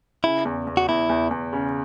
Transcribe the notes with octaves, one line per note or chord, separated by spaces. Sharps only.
C#3 E4
E2
E2
F#4
E2 E4
E2
E2
C#3